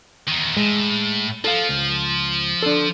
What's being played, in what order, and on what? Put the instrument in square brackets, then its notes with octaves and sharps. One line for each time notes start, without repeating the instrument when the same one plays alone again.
[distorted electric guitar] E2 D#3
[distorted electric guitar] A2 [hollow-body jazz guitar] G#3
[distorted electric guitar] F3 [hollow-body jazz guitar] A4 F5
[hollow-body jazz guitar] C#2
D4 A4